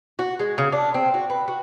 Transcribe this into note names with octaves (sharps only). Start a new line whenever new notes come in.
F#4
G#3
C#3
D4
C4
F#4
B4
F#4